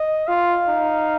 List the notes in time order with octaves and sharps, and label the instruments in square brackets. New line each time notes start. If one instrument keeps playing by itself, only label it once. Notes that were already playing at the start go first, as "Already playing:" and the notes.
Already playing: [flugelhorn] D#5
[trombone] F4 [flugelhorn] F5
[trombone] D#4